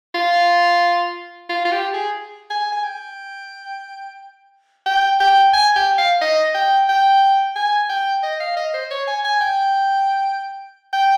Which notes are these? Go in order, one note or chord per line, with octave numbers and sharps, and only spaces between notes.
F4
F4
F4
G4
G#4
G#5
G#5
G5
G5
G5
G#5
G5
F5
D#5
G5
G5
G#5
G5
D#5
F5
D#5
C5
C#5
G#5
G#5
G5
G5